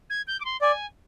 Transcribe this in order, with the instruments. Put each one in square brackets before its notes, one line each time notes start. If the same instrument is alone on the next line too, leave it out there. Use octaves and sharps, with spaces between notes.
[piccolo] G#6
G6
D6
C6
[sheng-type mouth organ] D5 [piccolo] G#5